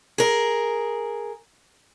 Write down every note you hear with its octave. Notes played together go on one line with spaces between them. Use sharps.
G#4 A#4